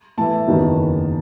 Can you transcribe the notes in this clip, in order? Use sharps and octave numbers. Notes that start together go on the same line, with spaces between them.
A2 E3 B3 E4 A5
F#1 E2 D#3 F#3 B3